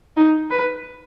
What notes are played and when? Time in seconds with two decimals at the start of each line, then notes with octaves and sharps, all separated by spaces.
0.16 D#4
0.50 B4